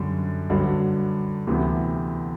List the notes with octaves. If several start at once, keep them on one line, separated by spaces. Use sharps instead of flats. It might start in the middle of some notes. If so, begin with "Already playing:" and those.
Already playing: F#2 D3 G3
G2 D3 F#3
D2 C3 E3 B3